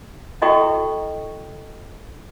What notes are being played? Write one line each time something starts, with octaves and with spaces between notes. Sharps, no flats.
E4 F#4 A4 D#5 G5 C#6